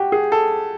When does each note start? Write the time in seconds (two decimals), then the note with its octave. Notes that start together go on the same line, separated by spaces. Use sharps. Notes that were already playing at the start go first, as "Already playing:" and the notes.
Already playing: F#4 G4
0.12 G#4
0.32 A4